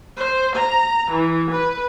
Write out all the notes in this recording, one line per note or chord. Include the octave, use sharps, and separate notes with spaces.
C5
A#5
E3
B4